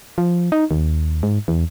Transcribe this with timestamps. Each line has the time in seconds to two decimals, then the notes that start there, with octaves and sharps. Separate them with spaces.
0.18 F3
0.52 D#4
0.71 D#2
1.23 G#2
1.48 E2